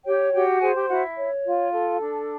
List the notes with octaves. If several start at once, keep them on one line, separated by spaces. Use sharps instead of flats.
G4 C#5 G5
F#4 G4 G5
G#4 C5 G#5
G4 G5
E4 F#4 F#5
C#5
F4
A4
D4